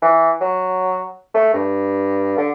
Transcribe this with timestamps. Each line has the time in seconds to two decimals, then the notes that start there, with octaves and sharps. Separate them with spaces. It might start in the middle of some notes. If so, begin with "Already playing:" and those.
0.02 E3
0.41 F#3
1.34 A3
1.54 G2
2.38 D3